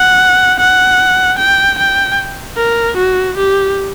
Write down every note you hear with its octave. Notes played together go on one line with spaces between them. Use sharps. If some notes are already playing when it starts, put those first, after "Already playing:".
Already playing: F#5
F#5
G5
G5
A#4
F#4
G4